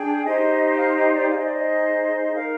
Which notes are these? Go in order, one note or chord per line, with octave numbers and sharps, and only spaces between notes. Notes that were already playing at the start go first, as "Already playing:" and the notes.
Already playing: D4 G#4 G5
D#4 G4 C5 D#5
F5
D#5
D5
D#4 G#4 C5 F5
D#5
D5
D#5
D#4 A#4 F5